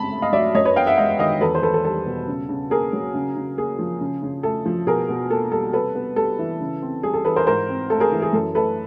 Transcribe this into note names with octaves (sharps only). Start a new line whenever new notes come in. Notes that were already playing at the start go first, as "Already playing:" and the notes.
Already playing: C#3 G#3 C4 A5 B5
A3
D#5 F5
F#3 D5 E5
F#2 C#5 D#5
B4 C#5
B3 F5 G5
E5 F#5
G#3 D#5 F5
D#3 D#5 F5
E2 A4 B4
C5
E2 A4 B4
A4
G3 A4
B2
C#3
C#3
A#3 G#4 A#4
F#3
C#3
C#3
A#3 G#4
F3
C#3
C#3
A3 A4
F3
B2 G#4 A#4
B2
A#3 A4
G3 A4
C3 A4 B4
B3
G3 A4
E3
C#3
C4
G3 G#4
A4
E3 A4 B4
A#4 C5
G#2 A#4 C5
C4
A3 A4
G#4 A#4
E3
G#4
F#2 A4
A3 A4 B4